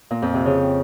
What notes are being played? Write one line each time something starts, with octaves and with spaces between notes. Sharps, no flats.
A#2
F2
C3
C#3